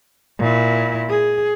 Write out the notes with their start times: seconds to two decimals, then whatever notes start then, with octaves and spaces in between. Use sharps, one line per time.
0.39 A#2 E4
1.09 G#4